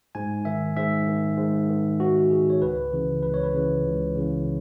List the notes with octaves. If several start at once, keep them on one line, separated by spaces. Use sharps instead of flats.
G#2 G#5
D#3 E5
G#2 E5
D#3
G#2
D#3
G#2 F#4
D#3 G#4
C#5
C#2 B4
C#3 E3
C#2 B4
C#5
B4
C#3 E3
C#2
C#3 E3